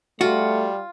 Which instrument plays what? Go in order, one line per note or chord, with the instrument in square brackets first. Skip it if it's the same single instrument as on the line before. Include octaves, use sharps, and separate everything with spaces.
[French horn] G3 [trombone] A3 [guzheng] F4 [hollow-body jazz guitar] F#4